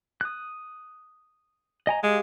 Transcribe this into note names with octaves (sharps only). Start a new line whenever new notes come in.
D#6 F#6
D#5 G#5 A#5
G#3 G4 F5